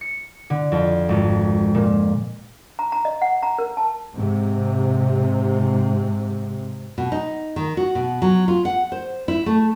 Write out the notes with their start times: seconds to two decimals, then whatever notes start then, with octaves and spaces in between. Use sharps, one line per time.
0.01 C#7
0.50 D3
0.72 F2
1.09 G#1
1.75 A#2
2.79 A#5
2.92 A#5
3.05 D#5
3.22 F#5
3.43 A#5
3.59 A#4
3.77 A5
4.14 G#2 C3
6.98 B2
7.12 D#4
7.56 D#3
7.77 F#4
7.95 B2
8.22 F#3
8.48 F4
8.65 F#5
8.92 C5
9.28 E4
9.46 A3